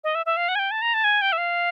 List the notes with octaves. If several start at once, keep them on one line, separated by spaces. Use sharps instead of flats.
D#5
E5
E5
F5
F#5
G#5
G5
A5
A#5
A5
G#5
G5
E5
F5